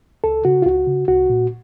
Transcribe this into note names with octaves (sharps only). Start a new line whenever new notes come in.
C#2 A4
C#3 F#4
F4
C#2 F#4
C#3
C2 F#4
A#2